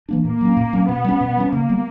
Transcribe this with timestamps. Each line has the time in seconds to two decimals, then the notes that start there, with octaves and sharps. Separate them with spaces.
0.09 E3 A#3 D4
0.25 A#2 A#3
0.41 F#3 C#4
0.57 A#2
0.73 F#3 C#4
0.89 B2 B3
1.04 G3 A#3 C#4
1.21 B2
1.37 G3 A#3 C#4
1.52 C#3 A#3
1.69 G3 B3